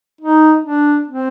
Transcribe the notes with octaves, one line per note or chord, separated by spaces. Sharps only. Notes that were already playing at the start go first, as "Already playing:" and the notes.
D#4
D4
C4